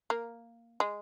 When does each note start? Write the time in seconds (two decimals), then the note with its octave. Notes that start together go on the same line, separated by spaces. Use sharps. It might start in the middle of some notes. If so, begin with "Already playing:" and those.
0.10 A#3
0.80 G#3